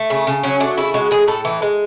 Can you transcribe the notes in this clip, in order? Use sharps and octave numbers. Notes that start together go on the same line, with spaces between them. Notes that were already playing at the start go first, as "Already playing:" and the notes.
Already playing: A3
C#3
C#3
F#3 C#4
A3 D4
C#3 E4
G#3 F#4
A2 G#4
A2 A4
E3
G#3